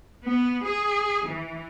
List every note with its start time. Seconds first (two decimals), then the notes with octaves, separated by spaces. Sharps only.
0.23 B3
0.65 G#4
1.26 E3